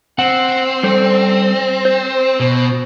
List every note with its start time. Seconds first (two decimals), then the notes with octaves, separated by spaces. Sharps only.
0.19 C4 F#5
0.83 G3 A4 C5
1.85 C5
2.40 B2